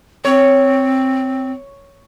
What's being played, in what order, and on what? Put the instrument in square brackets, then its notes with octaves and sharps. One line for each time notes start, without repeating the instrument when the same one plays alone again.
[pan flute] C4 [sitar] C#5